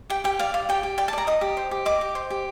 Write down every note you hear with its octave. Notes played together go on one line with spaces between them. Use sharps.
G4 G5
G4 G5
D5 F5
D5 F5
G4 G5
G4
D5 G5
A5
D5 A#5
D#5 D#6
G4
C5
G4
D#5 D6
G4
C5
G4